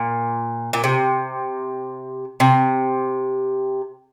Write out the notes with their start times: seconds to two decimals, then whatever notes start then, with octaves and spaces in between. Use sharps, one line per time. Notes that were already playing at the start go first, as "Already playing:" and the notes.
Already playing: A#2
0.73 A#2
0.84 C3
2.40 C3